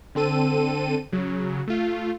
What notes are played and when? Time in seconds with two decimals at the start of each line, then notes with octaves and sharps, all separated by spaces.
0.15 D3 C4 A4 D#7
1.12 C#3 F#3
1.68 A3 F4